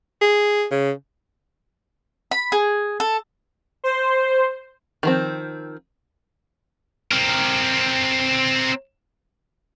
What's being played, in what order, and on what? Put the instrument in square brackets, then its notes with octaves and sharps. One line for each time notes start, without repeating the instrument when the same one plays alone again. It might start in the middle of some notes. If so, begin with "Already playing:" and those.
[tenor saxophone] G#4
C#3
[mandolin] B5
G#4
A4
[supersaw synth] C5
[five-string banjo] D#3 F3 C4
[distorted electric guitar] C4 A#4